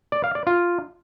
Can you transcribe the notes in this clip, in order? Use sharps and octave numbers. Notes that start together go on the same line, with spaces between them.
D5
F5
D5
F4